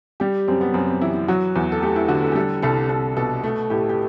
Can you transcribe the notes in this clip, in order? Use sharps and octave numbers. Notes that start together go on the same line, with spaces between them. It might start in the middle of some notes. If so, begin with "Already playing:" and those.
G3 G4
F#2 C4
B3
F#2 C4
C4
E3 E4
E4
F#3 F#4
E2
A4
A3 G4
E4
D3 F#4
A4
G4
G3 A4
C2 A4
C2 A4
B2 A4
A3
A2 G4
G4